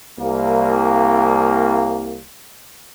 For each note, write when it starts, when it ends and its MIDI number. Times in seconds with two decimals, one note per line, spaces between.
0.19 2.19 36
0.19 2.19 58